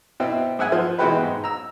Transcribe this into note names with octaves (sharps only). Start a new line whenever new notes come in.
B2 C4 E4
G#2 E5 F#5 G#5
F3
B2 E3 G#3 F#4 G4 B4
G#2 G#3
A#5 E6